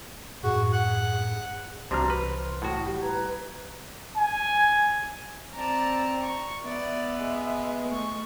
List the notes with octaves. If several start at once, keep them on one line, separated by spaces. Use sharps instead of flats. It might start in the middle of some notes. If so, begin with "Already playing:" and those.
F#2 A2 F#4 G#4
F#5
C2 C3 E3 D4 F#4 A#5 C6 F6
B4 C5
A2 F#4 F#5 D#6
G3
B4 A#5 G#6
G#5
C4 D5 A5 A#5
C#6
B3 D5 E5
G#3
A3 C#6